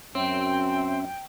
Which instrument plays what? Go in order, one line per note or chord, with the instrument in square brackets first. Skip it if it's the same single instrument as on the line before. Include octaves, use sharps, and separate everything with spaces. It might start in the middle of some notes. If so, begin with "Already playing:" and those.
[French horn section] F#2 [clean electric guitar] C4 [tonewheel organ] C#4 E5 [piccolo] G5